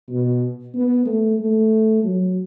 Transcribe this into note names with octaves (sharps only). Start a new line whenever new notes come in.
B2
B3
A3
A3
F#3